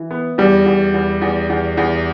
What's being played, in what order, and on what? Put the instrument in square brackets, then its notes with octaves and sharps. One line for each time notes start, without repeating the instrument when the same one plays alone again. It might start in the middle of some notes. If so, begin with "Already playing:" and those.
Already playing: [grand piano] E3
B3
[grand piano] E2 [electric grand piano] G3
[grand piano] E2
E2
E2
E2
E2